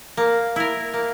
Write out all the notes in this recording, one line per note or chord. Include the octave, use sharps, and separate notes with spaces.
A#3
E4 A#4
A#3